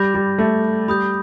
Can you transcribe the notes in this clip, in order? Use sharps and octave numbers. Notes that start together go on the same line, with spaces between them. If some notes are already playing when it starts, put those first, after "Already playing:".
Already playing: G3 B5 D6 G6 A#6
G3
A3
G3 B5 D#6 G6